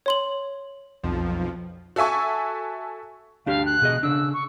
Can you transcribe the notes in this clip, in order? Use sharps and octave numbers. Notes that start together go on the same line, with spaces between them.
C#5 C6 F#7
B1 F2 F3
F#4 A4 E5 G#5 C#6
D2 D4 G4 F5
F#6
B2 G#4 D#5
C#3 D4 E6
C#6